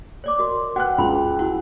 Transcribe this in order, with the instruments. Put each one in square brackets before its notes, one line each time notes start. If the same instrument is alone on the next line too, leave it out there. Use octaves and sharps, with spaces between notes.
[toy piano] C#5 D5 D6
[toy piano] F#4 D#5 [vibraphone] A#4 C6
[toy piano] F#4 B4 [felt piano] F#5 F#6 [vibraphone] G5
[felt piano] C#2 [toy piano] B5 C6
[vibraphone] E4 F#4 [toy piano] F#5